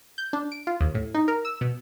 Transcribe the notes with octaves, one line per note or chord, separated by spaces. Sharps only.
G6
D4
D7
F4
D#2
A2
D#4
A#4
E6
B2